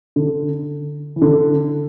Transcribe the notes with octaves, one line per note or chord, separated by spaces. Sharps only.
D3
E3
D3